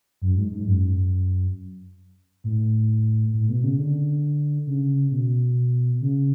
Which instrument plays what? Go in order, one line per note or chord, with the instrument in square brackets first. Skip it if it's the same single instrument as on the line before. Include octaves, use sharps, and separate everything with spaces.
[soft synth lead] F#2
G#2
G#2
F#2
A2
A2
B2
C#3
D3
C#3
B2
C#3